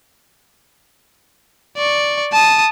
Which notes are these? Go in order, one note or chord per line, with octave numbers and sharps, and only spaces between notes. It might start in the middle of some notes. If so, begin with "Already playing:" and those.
D5 C#6
A5 D#6